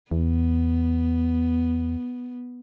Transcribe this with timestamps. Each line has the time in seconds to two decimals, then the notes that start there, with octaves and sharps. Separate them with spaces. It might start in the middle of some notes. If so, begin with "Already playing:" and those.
0.11 E2 B3